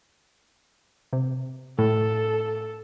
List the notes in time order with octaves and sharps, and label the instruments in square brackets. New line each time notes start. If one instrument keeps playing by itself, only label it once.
[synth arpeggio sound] C3
[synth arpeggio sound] A2 [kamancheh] A4